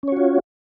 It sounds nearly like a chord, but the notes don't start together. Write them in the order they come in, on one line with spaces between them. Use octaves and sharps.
C#4 C#5 F#4 F4